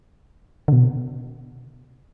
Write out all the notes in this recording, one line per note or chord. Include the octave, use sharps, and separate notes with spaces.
D3
B2